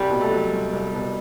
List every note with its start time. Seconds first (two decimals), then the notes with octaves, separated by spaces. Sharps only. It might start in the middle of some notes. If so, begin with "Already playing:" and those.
Already playing: C2 G3
0.10 B2
0.21 A3
0.31 F#3
0.52 C2
0.73 C2
0.93 B2